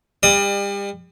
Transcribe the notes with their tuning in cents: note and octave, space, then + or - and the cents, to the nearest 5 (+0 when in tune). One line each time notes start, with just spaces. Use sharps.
G3 +35 D5 +45 D#6 +40